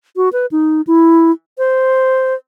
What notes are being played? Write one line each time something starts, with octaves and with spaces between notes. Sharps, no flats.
F#4
B4
D#4
E4
C5